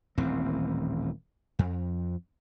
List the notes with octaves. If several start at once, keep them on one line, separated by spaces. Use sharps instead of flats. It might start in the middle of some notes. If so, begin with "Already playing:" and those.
D#1 A1 D#2 C4
F2